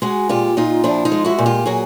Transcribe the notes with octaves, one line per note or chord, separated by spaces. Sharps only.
G#3 F#4 G#4
A#2 F4 G4
A#2 D#4 F4
F3 D4 E4
D#4 F4
G#3
E4 F#4
A#2
F4 G4
F#3 F#4 G#4